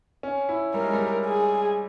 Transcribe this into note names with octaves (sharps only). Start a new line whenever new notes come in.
C#4
E4
G3 A#4
G#3
G3
G#4